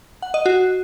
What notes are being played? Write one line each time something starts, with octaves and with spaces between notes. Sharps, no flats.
F#5
D#5
F#4